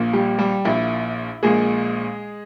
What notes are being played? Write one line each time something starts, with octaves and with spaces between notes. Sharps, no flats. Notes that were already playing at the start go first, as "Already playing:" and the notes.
Already playing: A#1 A#2 A#3
G3 G4
G3 G4
A#1 A#2 A#3 E4
A#1 A#2 G#3 A#3 G#4